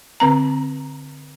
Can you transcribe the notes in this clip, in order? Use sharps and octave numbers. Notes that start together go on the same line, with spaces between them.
D3 C4 A#5